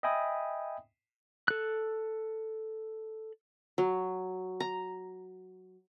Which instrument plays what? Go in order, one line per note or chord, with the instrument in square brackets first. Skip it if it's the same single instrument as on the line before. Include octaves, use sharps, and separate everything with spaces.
[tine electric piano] D#5 E5 G5 G#5 B5 D#6
[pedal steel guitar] A4 F#6
[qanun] F#3
A#5